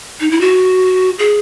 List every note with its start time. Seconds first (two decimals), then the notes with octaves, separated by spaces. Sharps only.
0.20 D#4
0.31 E4
0.41 F#4
1.19 G#4